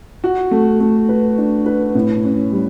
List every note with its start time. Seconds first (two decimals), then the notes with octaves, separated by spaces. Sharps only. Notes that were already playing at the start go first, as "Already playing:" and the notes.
0.24 F#4
0.51 A3
0.80 A3
1.09 B4
1.38 D4
1.66 B4
1.95 A2
2.24 C#4
2.52 G3